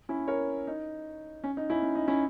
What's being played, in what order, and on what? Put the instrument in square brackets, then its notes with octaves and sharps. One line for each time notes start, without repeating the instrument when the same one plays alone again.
[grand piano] C#4 E4
A#4 C#5
D#4
C#4
D#4
C#4 E4
C#4
D#4
C#4 E4